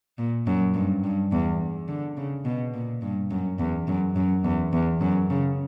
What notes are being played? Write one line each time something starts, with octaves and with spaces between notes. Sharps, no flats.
A#2
F#2
G2
G2
E2
D3
C#3
B2
A#2
G2
F#2
E2
F#2
F#2
E2
E2
F#2
C#3